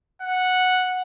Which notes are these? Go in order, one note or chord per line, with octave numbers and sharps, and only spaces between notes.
F#5